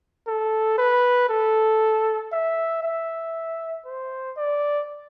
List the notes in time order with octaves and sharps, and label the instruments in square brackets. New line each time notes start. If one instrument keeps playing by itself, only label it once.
[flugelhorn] A4
B4
A4
E5
E5
C5
D5